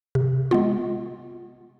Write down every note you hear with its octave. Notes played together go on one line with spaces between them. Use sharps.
C3
G#3 B3 F4